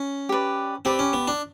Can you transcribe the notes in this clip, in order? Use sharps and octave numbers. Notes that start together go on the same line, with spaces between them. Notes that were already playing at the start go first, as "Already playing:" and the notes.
Already playing: C#4
G4 B4 D5
C4 G4 B4 D5
C#4
B3
D4